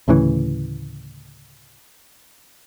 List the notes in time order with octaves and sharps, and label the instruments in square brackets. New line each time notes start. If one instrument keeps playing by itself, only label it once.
[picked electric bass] D2 A2 C#3 E3